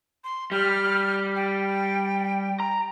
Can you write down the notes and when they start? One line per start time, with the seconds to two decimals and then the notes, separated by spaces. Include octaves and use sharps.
0.24 C6
0.52 G3 F6
1.35 G5
2.60 A#5